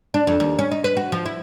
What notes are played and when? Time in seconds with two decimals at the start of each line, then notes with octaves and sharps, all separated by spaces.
0.14 D4
0.27 F2
0.40 D#2
0.59 C#4
0.72 D#4
0.84 B4
0.97 F#4
1.12 F3
1.26 E4